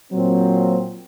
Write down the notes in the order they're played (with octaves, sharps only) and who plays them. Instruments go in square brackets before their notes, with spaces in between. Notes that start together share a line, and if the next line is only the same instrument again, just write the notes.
[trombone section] A#2 F#3 C4